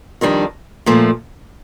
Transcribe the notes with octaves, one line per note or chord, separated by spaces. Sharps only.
F2 D#3 G3 D4
A#2 F3 A3